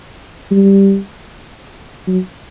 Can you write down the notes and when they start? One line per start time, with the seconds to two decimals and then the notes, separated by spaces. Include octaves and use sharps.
0.51 G3
2.07 F#3